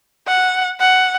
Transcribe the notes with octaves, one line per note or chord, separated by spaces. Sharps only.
F#5
F#5